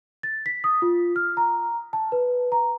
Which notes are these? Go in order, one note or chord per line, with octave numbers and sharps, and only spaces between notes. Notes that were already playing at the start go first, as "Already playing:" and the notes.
A6
B6
D#6
F4
F6
A#5
A5
B4
A#5